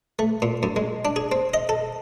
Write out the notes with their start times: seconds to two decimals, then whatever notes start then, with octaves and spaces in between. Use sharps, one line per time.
0.19 A3
0.42 A#2
0.63 F#2
0.76 G#3
1.05 D4
1.16 G#4
1.32 C4
1.54 D#5
1.69 A4